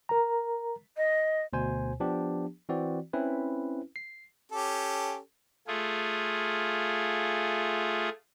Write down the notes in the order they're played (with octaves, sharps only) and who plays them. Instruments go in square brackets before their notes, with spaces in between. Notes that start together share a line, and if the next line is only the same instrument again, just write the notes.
[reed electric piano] A#4 A#5
[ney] D#5
[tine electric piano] D2 B2 C5 G#5
F3 B3 D4 G4
E3 C4 F#4 D5
C4 C#4 E4 B4
C7
[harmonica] C#4 G4 A4
[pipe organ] A3 F4 G#4